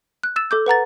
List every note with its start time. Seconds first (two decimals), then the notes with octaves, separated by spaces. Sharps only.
0.24 F#6
0.36 E6 A6 E7
0.51 A4 D6 G6
0.66 B4 F#5 A#5 A6